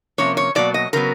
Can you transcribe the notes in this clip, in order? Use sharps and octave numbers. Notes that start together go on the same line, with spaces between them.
C3 F3 A#3 C#4 C#5
C#5
B2 F#3 A#3 D5
D#5
C#3 F#3 B3 A#4